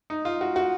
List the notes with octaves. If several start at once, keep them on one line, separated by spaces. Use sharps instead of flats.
D#4
F4
F#4
F#4